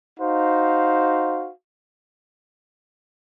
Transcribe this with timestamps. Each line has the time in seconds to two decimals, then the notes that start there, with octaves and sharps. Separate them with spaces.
0.19 D#4 F#4 C5 F5